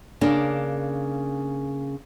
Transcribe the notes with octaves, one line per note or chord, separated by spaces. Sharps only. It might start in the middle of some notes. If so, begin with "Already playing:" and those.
C#3 A#3 D4